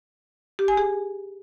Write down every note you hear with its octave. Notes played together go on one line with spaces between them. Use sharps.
G4
G#5
G#4